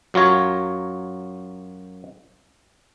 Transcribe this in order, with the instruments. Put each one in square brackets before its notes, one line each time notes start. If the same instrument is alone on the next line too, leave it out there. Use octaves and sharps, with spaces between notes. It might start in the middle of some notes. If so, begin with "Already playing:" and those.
[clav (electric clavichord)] F#2 F#3 F4 C#5 A#5